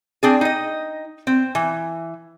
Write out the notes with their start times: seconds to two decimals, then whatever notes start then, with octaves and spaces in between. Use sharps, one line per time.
0.23 C4 D4 G#4
0.41 D#4 D#5
1.27 C4
1.55 E3